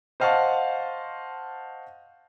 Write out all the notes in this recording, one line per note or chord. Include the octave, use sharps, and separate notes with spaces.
C5 D#5 F5 F#5 A5 C#6